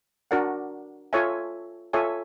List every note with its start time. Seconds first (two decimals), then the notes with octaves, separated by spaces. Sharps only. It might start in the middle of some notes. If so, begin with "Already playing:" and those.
0.31 D4 F#4 A#4 D5 F#5
1.13 F4 A4 C#5 E5 G#5
1.93 F4 A4 C#5 E5 G#5